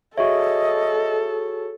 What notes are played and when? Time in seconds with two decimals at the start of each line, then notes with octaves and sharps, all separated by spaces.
0.18 F#4 G#4 A4 C#5 D#5 E5